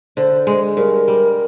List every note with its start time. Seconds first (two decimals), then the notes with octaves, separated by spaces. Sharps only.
0.17 D3 C5
0.47 G#3
0.77 G2 A#4
1.08 G3